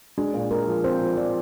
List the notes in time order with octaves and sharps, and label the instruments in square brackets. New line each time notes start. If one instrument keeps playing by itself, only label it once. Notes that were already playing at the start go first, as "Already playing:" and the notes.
[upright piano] G#3 [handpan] D4
[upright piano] A#2
[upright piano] G#3 [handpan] A#4
[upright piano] F3
[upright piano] C4 [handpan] C5
[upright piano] F3
[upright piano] F3 [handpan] D5